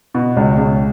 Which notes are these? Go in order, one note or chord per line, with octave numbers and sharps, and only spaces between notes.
B2
C#2
C#2